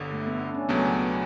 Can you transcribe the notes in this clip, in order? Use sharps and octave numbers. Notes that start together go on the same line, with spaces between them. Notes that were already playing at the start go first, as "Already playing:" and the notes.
Already playing: G1 G2 D3
A3
B3
D4
C#4
C#2 B2 F#3 A3 C#4
B3